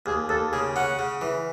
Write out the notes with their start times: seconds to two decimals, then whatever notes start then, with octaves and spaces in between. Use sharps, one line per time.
0.06 D#2 G#4
0.29 D#2 A4
0.52 C#3 G#4
0.76 C#4 F#5
0.99 C#3
1.21 E3